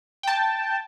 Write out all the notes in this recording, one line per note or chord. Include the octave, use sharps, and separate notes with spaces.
G5 A5